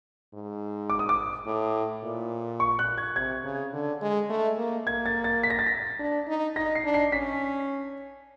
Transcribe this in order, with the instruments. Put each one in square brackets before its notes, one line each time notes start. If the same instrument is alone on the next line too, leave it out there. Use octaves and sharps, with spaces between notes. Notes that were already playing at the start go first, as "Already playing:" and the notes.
[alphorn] G#2
[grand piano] D6
D#6
D6
[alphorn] A2
A#2
[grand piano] C#6
F#6
G#6
[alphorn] C3 [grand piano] G#6
[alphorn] C#3
D3
G#3
A3
A#3
[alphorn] A#3 [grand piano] G#6
[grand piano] A6
A6
B6
A#6
A6
A#6
[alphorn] D4
D#4
[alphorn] D#4 [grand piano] A#6
[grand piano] C7
[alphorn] D4
[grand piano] C7
[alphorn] C#4 [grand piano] B6